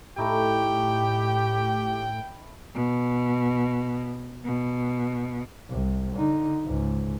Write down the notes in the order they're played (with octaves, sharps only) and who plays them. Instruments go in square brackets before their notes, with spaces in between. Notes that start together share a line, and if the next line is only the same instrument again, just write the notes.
[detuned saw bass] A2 [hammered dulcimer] A3 D#4 E4 [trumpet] G4 [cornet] G5
[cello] B2
B2
[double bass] C2
D3 D#4
C#2 G#2